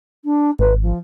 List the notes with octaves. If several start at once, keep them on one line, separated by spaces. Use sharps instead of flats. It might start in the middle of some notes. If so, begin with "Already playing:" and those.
D4
G#1 B4
F3